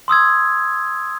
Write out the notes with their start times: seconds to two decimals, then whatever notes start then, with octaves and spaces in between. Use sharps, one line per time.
0.08 C6 D#6 E6 G#6